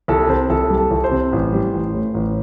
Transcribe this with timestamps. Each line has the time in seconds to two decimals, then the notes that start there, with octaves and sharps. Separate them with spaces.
0.08 C2 A4
0.28 C3 C5
0.50 C2 A4
0.70 G3
0.78 A4
0.91 C2
1.04 C5
1.11 C3
1.32 A1
1.53 G3
1.73 A1
1.94 A2
2.14 A1